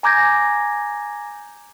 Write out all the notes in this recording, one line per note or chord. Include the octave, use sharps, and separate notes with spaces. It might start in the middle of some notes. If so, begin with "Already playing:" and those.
G#5 A#5 D6 G6 G#6 A#6